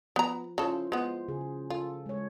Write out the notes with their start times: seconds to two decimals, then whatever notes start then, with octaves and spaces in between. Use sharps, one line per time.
0.16 F3 B3 A#5
0.58 C#3 E4 F4 A4 C5
0.92 G#3 B3 C5
1.28 C#3 G#4
1.70 F4 A4
2.06 G#3 C#5